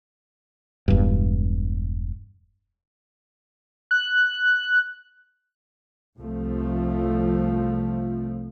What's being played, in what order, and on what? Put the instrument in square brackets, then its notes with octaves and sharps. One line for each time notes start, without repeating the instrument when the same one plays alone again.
[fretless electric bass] E1 G2
[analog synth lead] F#6
[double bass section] C2 F3 A3